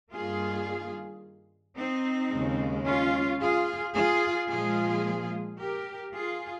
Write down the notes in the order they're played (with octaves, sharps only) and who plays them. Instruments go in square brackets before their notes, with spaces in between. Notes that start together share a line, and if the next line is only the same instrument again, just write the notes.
[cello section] G2 D#3 G3 A#3 F4 G#4
C4 D#4
D#2 C#3 G#3
C#4 F4
F4 G#4
F4 G#4
A#2 F3 G#3 F4 G#4
G4 A#4
F4 G#4